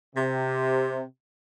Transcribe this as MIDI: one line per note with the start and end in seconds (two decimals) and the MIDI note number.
0.16 1.02 48